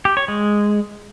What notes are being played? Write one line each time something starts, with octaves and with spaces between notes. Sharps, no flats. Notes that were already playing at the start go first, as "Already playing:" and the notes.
G4
C#5
G#3